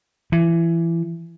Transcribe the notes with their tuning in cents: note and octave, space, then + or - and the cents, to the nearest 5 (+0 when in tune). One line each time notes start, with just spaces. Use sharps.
E3 +20